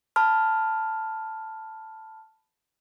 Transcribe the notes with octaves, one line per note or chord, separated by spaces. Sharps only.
A5 B5 F6